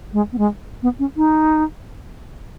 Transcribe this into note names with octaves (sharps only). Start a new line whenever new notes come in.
G#3
B3
G#3
B3
C#4
D#4